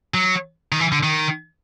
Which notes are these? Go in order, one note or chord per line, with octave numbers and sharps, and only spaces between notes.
F#3
D#3
E3
D3
D#3